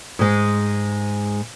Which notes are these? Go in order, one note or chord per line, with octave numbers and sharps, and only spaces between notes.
G#2 G#3